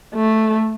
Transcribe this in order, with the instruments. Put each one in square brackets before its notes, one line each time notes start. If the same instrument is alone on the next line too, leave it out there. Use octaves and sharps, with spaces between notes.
[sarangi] A3